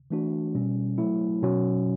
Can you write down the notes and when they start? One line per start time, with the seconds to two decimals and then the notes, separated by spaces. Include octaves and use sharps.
0.11 E3 A3 D4 F#4
0.55 B2 G3 C#4
0.98 F#3 A3 E4
1.42 B2 F#3 C#4 F#4